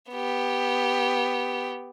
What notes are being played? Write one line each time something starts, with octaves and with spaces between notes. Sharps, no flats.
B3 G4